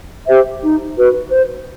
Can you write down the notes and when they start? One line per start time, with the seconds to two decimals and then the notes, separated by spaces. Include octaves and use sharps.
0.27 G4 C5 E5
0.62 D#4
0.96 F#4 B4
1.30 C5